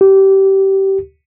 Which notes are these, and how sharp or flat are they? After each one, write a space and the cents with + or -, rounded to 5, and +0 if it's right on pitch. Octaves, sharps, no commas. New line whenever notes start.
G4 -20